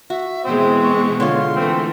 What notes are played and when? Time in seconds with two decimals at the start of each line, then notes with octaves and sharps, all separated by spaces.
0.10 F#4 E5
0.45 B2 E3 G#3 C4 C5
0.83 C#6
1.20 D3 F4 C#5 C6
1.56 E3 A3 C4